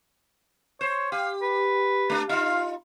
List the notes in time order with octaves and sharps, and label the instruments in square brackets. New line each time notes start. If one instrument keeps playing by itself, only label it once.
[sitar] C5 [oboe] C#5
[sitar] G4 [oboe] F5
[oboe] B4
[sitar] A3 D4
[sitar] D#4 F4 [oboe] F5